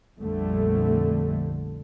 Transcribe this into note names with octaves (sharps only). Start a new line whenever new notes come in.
A#1 F2 D3 G3 A3